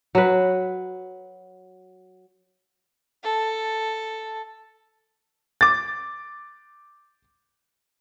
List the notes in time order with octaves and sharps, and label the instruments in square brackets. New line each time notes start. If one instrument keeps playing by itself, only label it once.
[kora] F#3 B4
[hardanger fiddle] A4
[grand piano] D6 A6